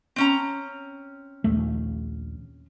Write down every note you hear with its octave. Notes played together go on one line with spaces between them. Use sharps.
C4 C#4 A#5
A#1 D#2 A3